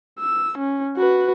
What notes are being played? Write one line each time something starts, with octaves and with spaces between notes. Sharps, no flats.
E6
C#4
F#4 B4